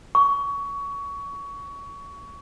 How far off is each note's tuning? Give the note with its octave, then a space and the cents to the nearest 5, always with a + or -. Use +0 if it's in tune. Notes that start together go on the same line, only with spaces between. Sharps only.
C#6 +25